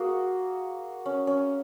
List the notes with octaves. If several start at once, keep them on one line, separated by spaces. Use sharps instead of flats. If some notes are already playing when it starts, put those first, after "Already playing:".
Already playing: A#3 F#4 G#4
C#4
C#4